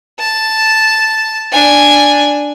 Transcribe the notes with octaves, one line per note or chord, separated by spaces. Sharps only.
A5
D4 G#5